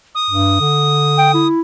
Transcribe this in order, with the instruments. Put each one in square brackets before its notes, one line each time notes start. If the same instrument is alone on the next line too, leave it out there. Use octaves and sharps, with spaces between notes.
[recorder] D#6
[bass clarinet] G2
D3
[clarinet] G5
E4